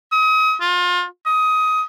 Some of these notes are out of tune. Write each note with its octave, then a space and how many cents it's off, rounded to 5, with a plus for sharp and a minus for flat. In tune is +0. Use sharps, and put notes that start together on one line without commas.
D#6 +35
F4 +30
D#6 +20